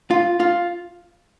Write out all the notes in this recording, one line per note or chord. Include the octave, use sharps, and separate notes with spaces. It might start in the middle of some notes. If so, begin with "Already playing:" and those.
F4
F4